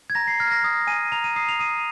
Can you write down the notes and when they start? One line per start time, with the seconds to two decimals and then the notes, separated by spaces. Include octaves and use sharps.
0.10 G#6
0.15 A#5 A#6
0.28 C7
0.40 F6 G#6
0.52 A#6
0.63 D#6 A#6
0.87 G#5 D#7
1.12 A#5 F7
1.24 D#7
1.36 D#6 C7
1.49 F7
1.60 D#6 D#7